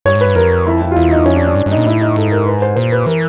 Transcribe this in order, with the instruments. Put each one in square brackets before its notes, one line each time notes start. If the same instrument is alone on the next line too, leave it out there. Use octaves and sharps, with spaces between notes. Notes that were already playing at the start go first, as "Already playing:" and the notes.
[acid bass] G2 [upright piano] C#5
[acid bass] G#2
[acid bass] G2 [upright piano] B4
[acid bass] F2 [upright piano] A#4
[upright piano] E4
E4
F4
[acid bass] E2 [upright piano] E4
[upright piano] D#4
[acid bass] F2 [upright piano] C#4
[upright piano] D4
D4
[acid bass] G2
[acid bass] G2 [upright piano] D4
[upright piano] D#4
[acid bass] A#2
[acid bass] A2 [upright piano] E4
[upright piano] D#4
[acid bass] G#2 [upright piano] A4
[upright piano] A#4
B4
C5
[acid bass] A#2 [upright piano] C5
[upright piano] B4
[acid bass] E3 [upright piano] A#4